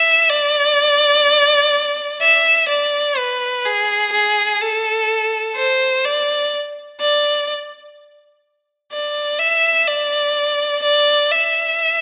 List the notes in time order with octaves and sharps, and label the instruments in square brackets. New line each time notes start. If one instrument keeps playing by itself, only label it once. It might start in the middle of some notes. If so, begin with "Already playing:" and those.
Already playing: [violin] E5
D5
E5
D5
B4
G#4
G#4
A4
C5
D5
D5
D5
E5
D5
D5
E5